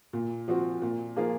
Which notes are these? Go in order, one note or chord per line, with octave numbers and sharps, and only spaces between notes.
A#2
F3 C4 F#4
A#2
F3 A#3 F4 G#4